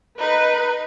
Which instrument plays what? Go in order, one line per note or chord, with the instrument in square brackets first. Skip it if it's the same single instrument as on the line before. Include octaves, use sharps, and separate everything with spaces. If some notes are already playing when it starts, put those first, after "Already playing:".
[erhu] D#4 [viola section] B4